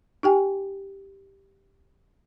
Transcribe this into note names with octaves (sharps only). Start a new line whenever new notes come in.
D#4 G4 G5 G#5